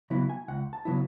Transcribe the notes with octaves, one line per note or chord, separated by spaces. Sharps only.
C#3 F#3 B3 E4 B5
G#5
C#2 F#5
A5
C#3 F#3 B3 E4